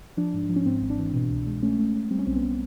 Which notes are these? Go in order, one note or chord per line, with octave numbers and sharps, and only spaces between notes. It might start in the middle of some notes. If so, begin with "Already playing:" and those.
F3 D4
G#2
F3
C#4
G#2 C4
G#1
D4
E3
B2
C2
G#3
A3 C#4
A3
A3
G3 C4
C#4
B1 C4
B3